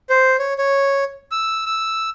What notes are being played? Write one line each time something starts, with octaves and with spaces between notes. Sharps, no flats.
C5
C#5
C#5
E6
E6